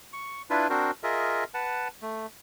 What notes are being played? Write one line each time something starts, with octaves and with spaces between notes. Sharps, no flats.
C#6
D4 E4 F4 B4
C4 D4 F#4 A#4 C5
F4 G#4 A#4 D#5 E5
B4 F#5 A5
A3